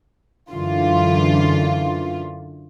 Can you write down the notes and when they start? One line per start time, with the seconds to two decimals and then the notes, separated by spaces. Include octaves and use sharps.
0.50 F#2 D3 E3 F4